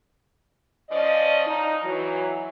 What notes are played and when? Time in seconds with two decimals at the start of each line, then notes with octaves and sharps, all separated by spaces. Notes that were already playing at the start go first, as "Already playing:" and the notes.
0.90 F3 C#4 D5 D#5
1.46 D#4
1.83 E3 F#3